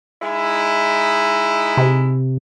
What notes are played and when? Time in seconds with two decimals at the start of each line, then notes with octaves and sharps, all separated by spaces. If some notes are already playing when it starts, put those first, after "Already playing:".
0.22 G#3 D#4 E4
1.77 C3